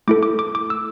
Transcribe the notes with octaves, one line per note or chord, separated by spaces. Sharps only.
A3 E4 A4 D6
D6
D6
D6
E6